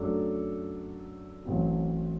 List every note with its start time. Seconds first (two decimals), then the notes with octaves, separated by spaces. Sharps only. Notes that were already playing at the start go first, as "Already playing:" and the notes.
Already playing: F#2 F#3 A3 D4 A4
1.45 A1 A2 F#3 C4 F#4